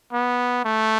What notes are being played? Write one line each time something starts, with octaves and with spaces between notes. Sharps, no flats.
B3
A3